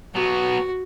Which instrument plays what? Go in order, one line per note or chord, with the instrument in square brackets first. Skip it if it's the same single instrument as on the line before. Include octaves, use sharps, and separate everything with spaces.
[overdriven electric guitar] F#3 B3 [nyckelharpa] F#4